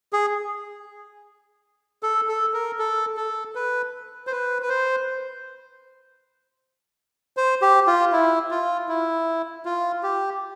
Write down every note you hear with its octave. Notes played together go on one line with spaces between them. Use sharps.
G#4
A4
A4
A#4
A4
A4
B4
C5
B4
B4
C5
C5
G4
F4
E4
F4
E4
F4
G4